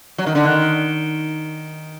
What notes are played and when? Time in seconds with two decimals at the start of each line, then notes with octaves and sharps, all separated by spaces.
0.18 F#3
0.27 D#3
0.35 D3
0.45 D#3